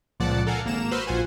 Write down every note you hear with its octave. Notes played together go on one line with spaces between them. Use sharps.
C#2 A#2 F3 D5 F#5 A5
A4 A#4 F5 F#5 G#5
G#1 A#3 A#5 E7
F#4 B4 C5 C6 E6 F6
A#1 F4 C5 F#5 G#5